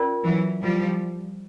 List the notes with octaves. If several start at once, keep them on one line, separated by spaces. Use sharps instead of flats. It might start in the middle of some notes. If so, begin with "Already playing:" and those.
Already playing: C#4 F4 A#4 D5
E3 F#3
F3 G3